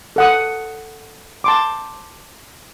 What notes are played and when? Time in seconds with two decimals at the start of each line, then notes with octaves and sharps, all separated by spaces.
0.16 A4 F#5 D#6
1.44 A5 C6 D6